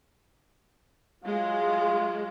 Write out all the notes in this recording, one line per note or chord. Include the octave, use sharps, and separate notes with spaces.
F#3 G#3 F4